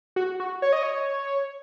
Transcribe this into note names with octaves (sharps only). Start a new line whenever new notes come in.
F#4
F#4
C#5
D#5
C#5